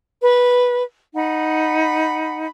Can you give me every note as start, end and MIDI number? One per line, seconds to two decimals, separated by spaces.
0.21 0.83 71
1.14 2.46 63
1.14 2.46 78
1.14 2.46 83